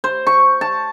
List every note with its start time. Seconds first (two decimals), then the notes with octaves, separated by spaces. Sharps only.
0.04 C5
0.27 C#6
0.61 A5